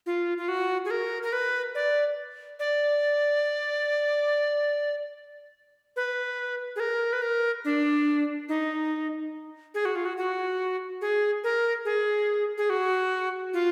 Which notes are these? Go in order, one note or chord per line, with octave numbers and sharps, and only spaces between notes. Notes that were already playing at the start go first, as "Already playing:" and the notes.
F4
F4
F#4
G#4
A#4
A#4
B4
D5
D5
B4
G#4
A#4
B4
A#4
D4
D#4
G#4
F#4
F4
F#4
F#4
G#4
A#4
G#4
G#4
F#4
F4